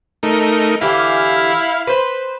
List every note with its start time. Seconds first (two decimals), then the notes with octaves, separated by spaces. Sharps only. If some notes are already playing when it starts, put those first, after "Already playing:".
0.23 A3 D#4 A#4
0.81 D3 E3 E4 G4 F5
1.87 B4 C5